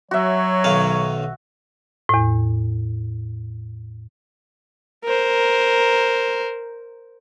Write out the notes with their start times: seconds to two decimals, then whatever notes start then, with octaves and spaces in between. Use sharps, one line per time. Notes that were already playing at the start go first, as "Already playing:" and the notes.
0.11 F#3 F#4 C#5 E5
0.64 B1 D#3 F5
2.09 E2 A2
5.05 A#4 C5